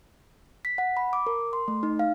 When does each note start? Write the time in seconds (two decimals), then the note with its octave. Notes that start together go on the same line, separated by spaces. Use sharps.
0.65 B6
0.78 F#5
0.97 B5
1.13 D6
1.27 A#4
1.53 C6
1.68 A3
1.83 D#4
1.99 F5